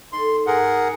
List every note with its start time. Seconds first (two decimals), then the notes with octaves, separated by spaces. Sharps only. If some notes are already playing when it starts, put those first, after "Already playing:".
0.13 D#4 A4 C6
0.47 G#2 G#4 A#4 F#5